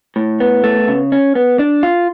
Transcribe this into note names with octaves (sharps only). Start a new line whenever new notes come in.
A2
B3
A3
C#3
C#4
B3
D4
F4